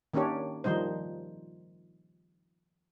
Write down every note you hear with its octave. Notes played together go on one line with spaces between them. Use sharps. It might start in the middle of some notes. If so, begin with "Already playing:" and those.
D#3 A#3 C#4 D4 G4 C#5
D#3 F3 G3 D#4 C5